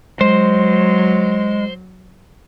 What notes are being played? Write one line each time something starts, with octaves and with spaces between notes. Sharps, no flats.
F#3 G#3 C5